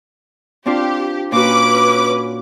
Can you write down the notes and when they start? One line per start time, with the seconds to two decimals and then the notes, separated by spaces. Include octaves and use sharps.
0.66 C4 D4 F4 G4
1.32 A#2 C#4 F#4 B4 D6